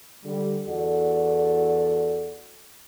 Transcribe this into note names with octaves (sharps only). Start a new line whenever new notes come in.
D3 G3 G4
E2 F#4 A4 D5